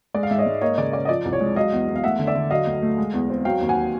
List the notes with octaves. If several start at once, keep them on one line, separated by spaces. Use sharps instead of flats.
G#3 D5
F5
G#2 E5
C#5 D#5
G#2
A#3 C#5 D#5
C#3 D5
C#4 D5
D#5
F3 D5
C2
C#5
G#3
F#3 D#5 F5
E2
E2
F5
A3 E5 F#5
D3
D5 E5
D3
F#3 D#5 F5
D2
A3
G#3
E2
C4
F#3 F5 G5
D#2
F#5 G#5